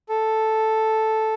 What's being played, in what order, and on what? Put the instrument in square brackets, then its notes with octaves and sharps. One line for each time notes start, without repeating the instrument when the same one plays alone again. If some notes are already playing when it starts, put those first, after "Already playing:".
[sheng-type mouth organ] A4